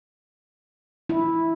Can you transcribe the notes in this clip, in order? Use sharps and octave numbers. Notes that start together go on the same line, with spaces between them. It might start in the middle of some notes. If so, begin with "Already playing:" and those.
E4